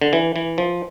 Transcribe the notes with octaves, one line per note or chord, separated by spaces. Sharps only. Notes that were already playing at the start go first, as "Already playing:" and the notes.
D3
E3
E3
F3